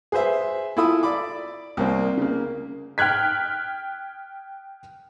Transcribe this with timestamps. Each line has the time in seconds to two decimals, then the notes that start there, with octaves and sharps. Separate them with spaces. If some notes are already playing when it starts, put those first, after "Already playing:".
0.12 G#4 B4 C5 E5
0.77 E4 F4 A4 B5 D#6 E6
1.03 D5 B5 D6
1.77 C2 A#3 C4
2.17 C#3 A#3
2.98 G5 F6 F#6 G#6 B6